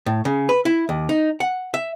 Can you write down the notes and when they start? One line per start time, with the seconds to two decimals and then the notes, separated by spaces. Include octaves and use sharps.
0.06 A2
0.25 C#3
0.49 B4
0.65 E4
0.89 D#2
1.09 D#4
1.40 F#5
1.74 E5